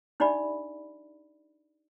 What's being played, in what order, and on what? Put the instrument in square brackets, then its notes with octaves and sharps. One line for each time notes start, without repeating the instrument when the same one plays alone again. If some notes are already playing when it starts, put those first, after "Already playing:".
[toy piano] D4 D#4 G4 D5 E5 B5